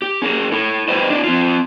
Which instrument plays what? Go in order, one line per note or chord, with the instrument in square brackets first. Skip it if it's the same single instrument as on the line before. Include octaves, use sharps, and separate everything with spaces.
[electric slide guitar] G4
C#4 G#4 A#4
E4 A4
E4 G4 B4 C5 D#5
D4 E4
C4 F4